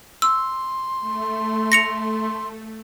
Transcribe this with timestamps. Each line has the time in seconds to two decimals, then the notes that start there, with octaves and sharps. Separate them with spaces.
0.22 C6 E6
1.00 A3
1.72 A#6 C#7 F7